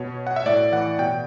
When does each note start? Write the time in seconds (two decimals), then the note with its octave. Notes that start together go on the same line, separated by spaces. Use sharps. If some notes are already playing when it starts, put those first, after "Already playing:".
Already playing: B2 C#5
0.27 F#5
0.36 E5
0.46 A2 D5
0.72 E3 F#5
0.99 B2 G5